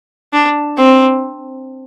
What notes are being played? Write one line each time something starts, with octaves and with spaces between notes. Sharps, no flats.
D4
C4